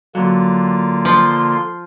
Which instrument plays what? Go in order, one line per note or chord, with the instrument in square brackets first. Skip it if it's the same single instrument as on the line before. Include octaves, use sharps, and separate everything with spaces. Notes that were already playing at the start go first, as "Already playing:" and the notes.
[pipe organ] D3 A#3 F4 [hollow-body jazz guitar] F#3
[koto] F3 [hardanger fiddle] C6